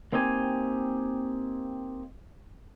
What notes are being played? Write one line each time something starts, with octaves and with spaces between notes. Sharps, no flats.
A#3 C4 D#4 G4 G#5